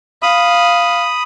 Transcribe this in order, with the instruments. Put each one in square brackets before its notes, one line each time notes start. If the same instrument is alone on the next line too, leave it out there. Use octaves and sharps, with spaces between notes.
[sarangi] F5 [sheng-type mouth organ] B5 D#6